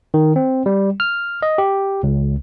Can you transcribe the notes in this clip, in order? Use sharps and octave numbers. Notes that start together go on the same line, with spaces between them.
D#3
C4
G3
F6
D#5
G4
C#2